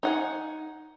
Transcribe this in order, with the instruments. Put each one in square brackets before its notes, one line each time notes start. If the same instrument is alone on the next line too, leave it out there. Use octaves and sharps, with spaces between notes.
[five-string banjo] D#4 F#5 G#5